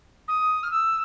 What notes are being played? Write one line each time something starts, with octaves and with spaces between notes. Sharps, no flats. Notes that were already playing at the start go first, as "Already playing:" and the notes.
D#6
F6
E6